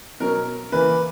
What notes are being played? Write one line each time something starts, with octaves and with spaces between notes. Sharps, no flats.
B2 F#3 C#4 A#4
C#3 E3 A#3 B4